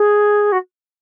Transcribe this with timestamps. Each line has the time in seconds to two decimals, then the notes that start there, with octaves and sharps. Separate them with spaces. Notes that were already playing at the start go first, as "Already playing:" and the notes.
Already playing: G#4
0.52 F#4